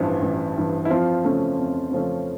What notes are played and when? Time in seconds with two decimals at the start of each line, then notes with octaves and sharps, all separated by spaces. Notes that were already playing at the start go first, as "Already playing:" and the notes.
Already playing: A1 G2 E3 F3
0.22 A1
0.57 G2 E3
0.85 E4
0.90 F2 F3 F4
1.24 C#3 F3 A3 C#4
1.58 F2
1.91 C#3 F3 A3 C#4